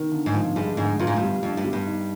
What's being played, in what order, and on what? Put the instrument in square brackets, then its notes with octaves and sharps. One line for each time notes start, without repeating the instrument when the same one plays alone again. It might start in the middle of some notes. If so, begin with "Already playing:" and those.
Already playing: [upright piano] D#3
D3
[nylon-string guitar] G#2
[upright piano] F3
[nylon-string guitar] G2 [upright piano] G#3
[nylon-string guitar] G#2 [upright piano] D3
[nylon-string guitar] G2 [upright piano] F4
[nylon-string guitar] G#2
[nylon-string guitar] G2 [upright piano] G3
[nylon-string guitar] F2 [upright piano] D4
[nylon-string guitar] G2
[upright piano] G3
[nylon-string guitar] G2
[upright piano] D#4